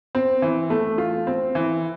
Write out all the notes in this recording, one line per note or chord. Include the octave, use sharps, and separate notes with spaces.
C4
E3
A3
F4
C4
E3